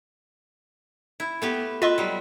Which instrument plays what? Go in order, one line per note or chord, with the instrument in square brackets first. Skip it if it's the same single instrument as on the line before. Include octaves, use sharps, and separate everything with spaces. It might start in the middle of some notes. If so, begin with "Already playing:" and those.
[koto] E4
A3 B3 G4
[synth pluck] F4 D#5 C6 [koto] B4 E5
[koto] F#3 G3